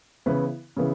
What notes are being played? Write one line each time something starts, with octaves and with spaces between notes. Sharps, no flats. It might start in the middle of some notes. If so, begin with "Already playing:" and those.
C#3 E3 B3 E4 B4
C#3 E3 B3